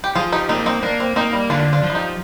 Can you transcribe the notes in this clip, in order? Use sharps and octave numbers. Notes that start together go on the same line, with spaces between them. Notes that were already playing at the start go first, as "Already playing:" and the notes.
G4
F3 F4 G#4
D#4 G4
A#3 C4 D#4
C4 D#4
A#3 D4
C4
A#3 C4 D#4
G3
D3 D4 F4
D4 F4
F3
F4
D#4 G4